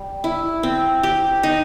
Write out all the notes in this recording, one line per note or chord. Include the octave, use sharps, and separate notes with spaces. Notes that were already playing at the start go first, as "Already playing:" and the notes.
Already playing: G3
E4
C4
G4
D#4